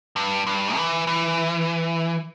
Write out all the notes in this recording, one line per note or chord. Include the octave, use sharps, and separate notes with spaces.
G2
G2
E3
E3